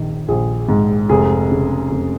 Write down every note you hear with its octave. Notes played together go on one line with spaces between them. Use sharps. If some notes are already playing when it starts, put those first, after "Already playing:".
Already playing: A#1 D#3
A#1 G#4
G#2
F1 G#4
C#3
F1